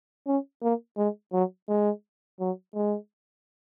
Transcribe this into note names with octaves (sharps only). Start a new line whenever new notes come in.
C#4
A#3
G#3
F#3
G#3
F#3
G#3